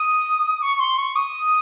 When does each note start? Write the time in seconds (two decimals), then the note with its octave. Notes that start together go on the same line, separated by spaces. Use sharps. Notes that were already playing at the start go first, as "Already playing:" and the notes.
Already playing: D#6
0.62 C#6
0.80 C6
0.98 C#6
1.16 D#6